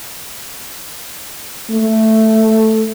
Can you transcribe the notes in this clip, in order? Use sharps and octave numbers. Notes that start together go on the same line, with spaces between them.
A3